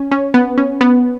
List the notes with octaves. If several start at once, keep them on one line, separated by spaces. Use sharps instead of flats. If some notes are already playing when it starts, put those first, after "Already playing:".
Already playing: C#4
C#4
B3
C#4
B3